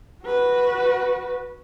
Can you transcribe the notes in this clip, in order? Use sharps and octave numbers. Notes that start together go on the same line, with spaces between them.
F#4 B4